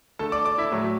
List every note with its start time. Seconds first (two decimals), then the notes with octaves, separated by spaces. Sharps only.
0.19 D3 A3 A4 A5
0.32 D5 D6
0.45 D5 D6
0.58 E4 E5
0.71 A2 F#3 A3